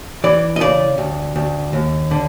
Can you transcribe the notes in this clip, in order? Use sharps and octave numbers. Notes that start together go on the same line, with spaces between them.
E3 D5
D#5
C#3 D5
D2
D2
D#2
D3